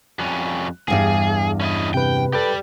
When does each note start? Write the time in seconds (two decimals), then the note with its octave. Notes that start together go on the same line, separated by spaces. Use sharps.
0.19 F2 G3 C#4 F#6
0.88 E2 G2 G3 G#4
1.60 C#4 E4 D#5
1.94 C3 B4 G5
2.33 G4 A4 B4 D5 G5